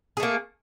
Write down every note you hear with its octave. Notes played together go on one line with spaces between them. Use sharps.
A3 A#3 G#4